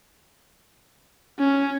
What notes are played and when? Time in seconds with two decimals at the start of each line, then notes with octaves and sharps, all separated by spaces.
1.39 C#4